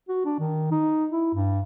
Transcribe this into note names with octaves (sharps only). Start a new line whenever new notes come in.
F#4
D4
D#3
D#4
E4
G2